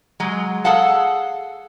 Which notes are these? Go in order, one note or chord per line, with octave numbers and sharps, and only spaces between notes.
F#3 G#3
G#4 A4 F5 F#5 A5